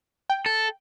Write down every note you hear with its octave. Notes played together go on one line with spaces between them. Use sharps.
G5
A4